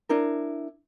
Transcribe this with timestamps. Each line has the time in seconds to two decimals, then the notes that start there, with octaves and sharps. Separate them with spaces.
0.09 D4 E4 A#4